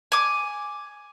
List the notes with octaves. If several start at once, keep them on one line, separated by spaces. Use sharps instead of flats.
G#5 D6